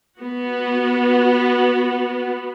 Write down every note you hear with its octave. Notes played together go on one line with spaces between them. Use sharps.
B3 F#4